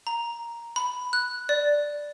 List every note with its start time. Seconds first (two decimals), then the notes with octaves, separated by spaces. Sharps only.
0.07 A#5
0.76 B5
1.13 F#6
1.49 D5